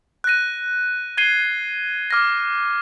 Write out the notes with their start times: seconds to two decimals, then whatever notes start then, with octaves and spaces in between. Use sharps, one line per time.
0.24 F#6 A#6 D#7
1.18 G#6 C7 D#7 G7
2.11 D6 F6 A#6